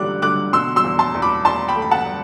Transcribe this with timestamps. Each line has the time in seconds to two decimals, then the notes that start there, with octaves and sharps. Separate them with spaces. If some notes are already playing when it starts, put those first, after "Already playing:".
Already playing: D3 G3 D6 F#6
0.22 D3 D6 F#6
0.53 B2 C6 E6
0.76 C6 E6
0.84 E2
0.99 A5 C6
1.15 E2
1.22 B5 D6
1.45 E2 A5 C6
1.68 G5 B5
1.76 A3
1.82 B5
1.91 F#5 A5